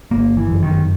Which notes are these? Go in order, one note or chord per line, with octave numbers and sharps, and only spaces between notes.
G1 A#3
E3
F#2
D#3